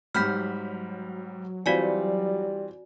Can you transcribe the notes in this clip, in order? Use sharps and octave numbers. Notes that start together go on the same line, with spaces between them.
G#2 F#3 G3 B5 F6 G6 B6
E3 G3 C4 F4 F#4 D5 G#5